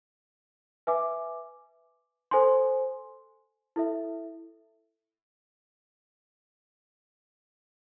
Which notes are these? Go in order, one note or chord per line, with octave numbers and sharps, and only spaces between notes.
B4 E5 G#5 D6
A4 C5 G#5 C6
E4 A4 E5